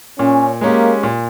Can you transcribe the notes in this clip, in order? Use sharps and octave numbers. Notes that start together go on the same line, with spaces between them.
A#2 C#4
G#3 A#3 C#4 G4
A#2